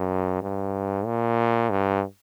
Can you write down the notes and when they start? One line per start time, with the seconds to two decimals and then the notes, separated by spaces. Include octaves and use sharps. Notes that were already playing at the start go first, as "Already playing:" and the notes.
Already playing: F#2
0.42 G2
1.06 A#2
1.70 G2